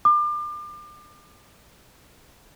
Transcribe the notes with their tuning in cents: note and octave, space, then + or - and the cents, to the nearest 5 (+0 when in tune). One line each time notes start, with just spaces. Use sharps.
D6 +35